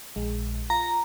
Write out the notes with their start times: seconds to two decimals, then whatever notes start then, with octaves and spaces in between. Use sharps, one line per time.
0.16 A#1 G#3
0.70 F4 A#5